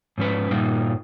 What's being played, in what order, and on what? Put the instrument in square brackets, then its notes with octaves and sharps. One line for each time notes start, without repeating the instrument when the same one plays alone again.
[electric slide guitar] G#2 F3 C#4 B4
G2 A#2 G3 A#3 D#4 F4